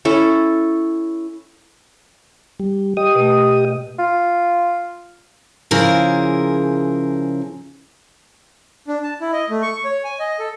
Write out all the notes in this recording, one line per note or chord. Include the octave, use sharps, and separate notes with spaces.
C#4 E4 A4
G3
G4 D#5 D#6
B2 A3
F4
C#3 F3 E4 G#4 A#4
D4
A5
E4
D#5
A3
C#6
C#5
G#5
D#5
A4